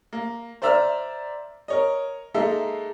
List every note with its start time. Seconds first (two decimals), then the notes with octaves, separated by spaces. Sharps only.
0.13 A#3
0.62 C5 D5 E5 A#5 E6 F6
1.68 A#4 C#5 D#5
2.34 G#3 A#3 D#4 A4 E5